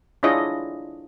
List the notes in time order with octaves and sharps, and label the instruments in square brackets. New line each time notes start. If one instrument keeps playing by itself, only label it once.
[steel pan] D4 E4 F4 G#4 C#5 D#5